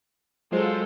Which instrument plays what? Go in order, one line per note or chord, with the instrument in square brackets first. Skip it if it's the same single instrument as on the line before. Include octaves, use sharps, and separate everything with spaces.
[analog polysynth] F#3 F4 C5 [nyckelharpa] G#3 A4